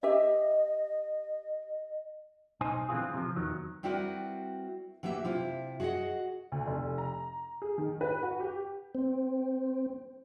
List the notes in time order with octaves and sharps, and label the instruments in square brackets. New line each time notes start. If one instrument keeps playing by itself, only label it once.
[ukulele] G4 E5 [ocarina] D#5
[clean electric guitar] B1 D#4 C5 G#5
D3 E3 A3 C4 F4 G#4
C3 F3
E2 D#3 F#3
[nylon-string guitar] G3 C4 E4 F#4 A#4 B4
E3 F#3 A#3 G4 E5
C3 E4 F4
F#4 G#4 C#5 D#5 F#5
[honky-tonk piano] D2
F1
A#5
G#4
D#3
B4
F#4
G4
[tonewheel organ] C4